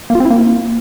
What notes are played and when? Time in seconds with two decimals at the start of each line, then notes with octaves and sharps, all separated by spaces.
0.10 A#3
0.15 F4
0.20 C4
0.25 E4
0.30 A#3